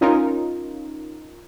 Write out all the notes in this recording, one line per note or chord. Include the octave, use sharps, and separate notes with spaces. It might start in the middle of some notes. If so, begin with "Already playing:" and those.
C#4 D#4 F4 A#4